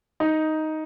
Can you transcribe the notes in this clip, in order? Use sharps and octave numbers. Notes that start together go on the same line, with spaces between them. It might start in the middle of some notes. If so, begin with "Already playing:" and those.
D#4